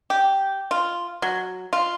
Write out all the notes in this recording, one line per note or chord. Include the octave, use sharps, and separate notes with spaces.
G4
F4
F#3
F4